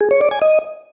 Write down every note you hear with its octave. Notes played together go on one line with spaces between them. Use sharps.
G#4
C#5
D5
G#5
D#5